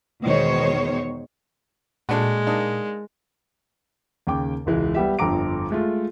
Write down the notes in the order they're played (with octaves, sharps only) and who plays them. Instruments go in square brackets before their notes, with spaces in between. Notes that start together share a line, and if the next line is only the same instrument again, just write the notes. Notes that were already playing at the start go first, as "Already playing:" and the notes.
[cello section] E2 B2 D#3 G#3 C5 C#5
[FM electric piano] A#2 [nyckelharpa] G#3 [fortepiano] A3 D4 F#4
[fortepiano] A#3 D4 D#4
[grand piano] D#2 C#3 G5 D6
E1 C#2 E3 G#3
G3 B3 G4 E5
G1 F2 D3 A#5 D6 D7
G#3 A3 F4